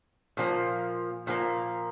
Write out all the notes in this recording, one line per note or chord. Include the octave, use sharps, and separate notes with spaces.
A#2 F3 A#3
A#2 F3 A#3